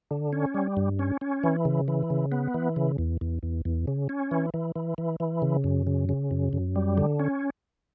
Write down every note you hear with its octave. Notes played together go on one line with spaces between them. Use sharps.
D3
C#4
G3
G2
C#4
C#4
E3
C#3
E3
C#3
B3
E3
C#3
E2
E2
E2
E2
C#3
C#4
E3
E3
E3
E3
E3
C#3
F#2
C#3
C#3
F#2
F#2
G3
D3
C#4